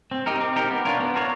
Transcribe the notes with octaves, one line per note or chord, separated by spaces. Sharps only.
C4
D#4 G4 A#4
C4
D#4 G4 A#4
B3
D4 F4 A#4 C#5
B3
D4 F4 A#4 C#5